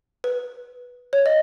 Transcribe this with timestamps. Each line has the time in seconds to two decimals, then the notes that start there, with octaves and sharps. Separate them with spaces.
0.24 B4
1.13 C#5
1.26 D#5